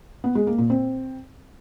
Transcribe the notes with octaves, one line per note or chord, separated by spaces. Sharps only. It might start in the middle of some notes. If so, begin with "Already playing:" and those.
B3
G#3
A#3
A#2
C4